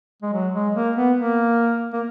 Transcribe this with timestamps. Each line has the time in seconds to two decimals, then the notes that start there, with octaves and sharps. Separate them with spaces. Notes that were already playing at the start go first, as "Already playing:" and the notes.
0.23 G#3
0.33 F#3
0.54 G#3
0.75 A#3
0.96 B3
1.17 A#3
1.93 A#3